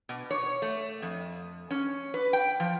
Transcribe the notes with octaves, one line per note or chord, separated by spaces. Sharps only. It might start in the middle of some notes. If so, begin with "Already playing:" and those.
B2
C#5
A3
F2
C#4
B4
G5
F3